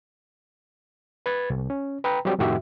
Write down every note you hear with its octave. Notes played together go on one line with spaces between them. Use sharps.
B4 G#6 A6
C2
C#4
B4 G5 A#5 B5
F#3 G3 C4 G4
F2 A2 D#3 F#4 G4 E5